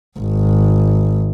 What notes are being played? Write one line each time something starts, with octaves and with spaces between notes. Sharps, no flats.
G#1